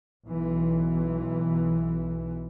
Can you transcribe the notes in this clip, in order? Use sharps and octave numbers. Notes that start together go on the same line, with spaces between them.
B1 E3